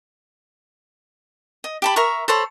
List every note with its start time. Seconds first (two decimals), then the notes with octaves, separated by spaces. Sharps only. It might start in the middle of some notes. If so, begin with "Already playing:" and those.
1.64 D#5
1.82 G4 A5 B5
1.96 A#4 E5 A#5 C#6
2.28 A4 C5 C#5 B5